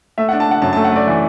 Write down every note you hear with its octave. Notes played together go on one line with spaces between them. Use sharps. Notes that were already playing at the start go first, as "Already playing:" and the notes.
A3 E5
F#5
D4
A5
D4 F#5
F#2 A5
A5
A3
F#5
A3 D5
E3